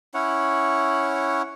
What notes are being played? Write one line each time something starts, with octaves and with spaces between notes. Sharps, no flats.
C#4 E4 C#5 F#5